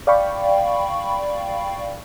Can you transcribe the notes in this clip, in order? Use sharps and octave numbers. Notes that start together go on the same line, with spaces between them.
D5 F5 G5 B5 C#6